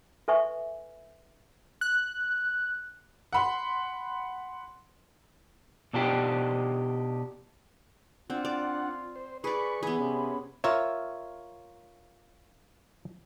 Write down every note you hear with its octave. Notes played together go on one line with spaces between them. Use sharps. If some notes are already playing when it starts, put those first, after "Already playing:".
A4 B4 E5 G#5 C#6
F#6
F#5 B5 C6
B2 D4 D#4 F4 G4
C4 D4 F4 F#5
D5
C5
G#4 B4 D5 B5 C#6
E3 B3 G#4 B5
C3 C#4
F4 A#4 C#5 E5